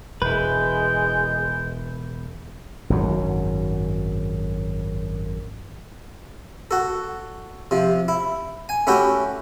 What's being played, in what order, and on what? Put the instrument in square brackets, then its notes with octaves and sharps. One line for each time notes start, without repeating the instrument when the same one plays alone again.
[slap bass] E1 [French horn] G#3 [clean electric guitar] E4 B4 [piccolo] G6
[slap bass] G#1 F#2 F#3
[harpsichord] F#4 A4
C3 F3
E4
G#5
A3 C#4 E4 F#4 G4